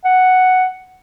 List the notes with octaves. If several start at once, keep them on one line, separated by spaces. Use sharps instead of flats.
F#5